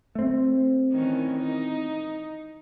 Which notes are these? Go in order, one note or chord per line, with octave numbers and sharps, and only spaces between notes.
A3 C4
D#3 E3 C#4
D#4